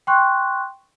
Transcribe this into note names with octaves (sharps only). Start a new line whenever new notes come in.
G5 C6 C#6 F#6